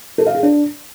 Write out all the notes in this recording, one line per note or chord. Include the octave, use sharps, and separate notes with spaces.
A4
F5
G#4
D4